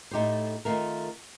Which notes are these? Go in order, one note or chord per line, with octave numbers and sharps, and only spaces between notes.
A2 A3 D#4 G4 C5
D#3 A3 C4 F4 A#4